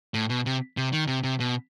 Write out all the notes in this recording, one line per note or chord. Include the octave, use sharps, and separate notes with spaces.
A2
B2
C3
C3
D#3
C3
C3
B2